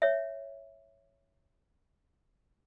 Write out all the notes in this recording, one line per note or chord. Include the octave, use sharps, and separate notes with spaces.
C#5 E5